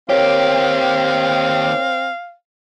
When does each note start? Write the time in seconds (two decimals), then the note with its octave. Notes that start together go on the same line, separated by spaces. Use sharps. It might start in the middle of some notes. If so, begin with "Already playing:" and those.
0.10 D#2 C4 G4 A#4 C#5 F5